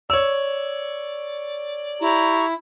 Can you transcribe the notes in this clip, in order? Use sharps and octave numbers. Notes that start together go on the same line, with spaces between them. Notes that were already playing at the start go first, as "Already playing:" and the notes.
C#5 D5 E6
E4 G4 A#5 C#6